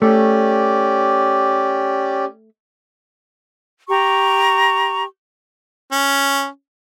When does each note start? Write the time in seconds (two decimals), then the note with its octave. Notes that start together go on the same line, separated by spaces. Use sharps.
0.02 A3 C#4 G4 D5
3.89 G4 A#5 C#6
5.92 C#4